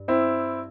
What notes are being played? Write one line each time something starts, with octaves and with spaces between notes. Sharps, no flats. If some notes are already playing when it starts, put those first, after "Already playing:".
Already playing: G2
C4 E4